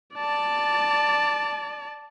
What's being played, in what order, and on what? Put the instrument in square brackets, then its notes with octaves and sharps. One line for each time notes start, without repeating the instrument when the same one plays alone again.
[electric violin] D5 A5